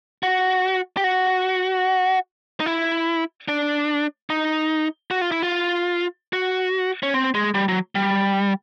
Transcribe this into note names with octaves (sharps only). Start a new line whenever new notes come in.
F#4
G4
F#4
D#4
E4
D4
D#4
F#4
F4
E4
F4
F#4
C#4
C4
G#3
G3
F#3
G3